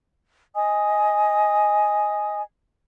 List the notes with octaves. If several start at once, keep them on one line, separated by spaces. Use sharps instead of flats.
D#5 G#5 D#6